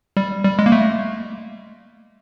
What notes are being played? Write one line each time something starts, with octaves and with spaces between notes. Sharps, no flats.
G3
G3
G#3
A#3
A3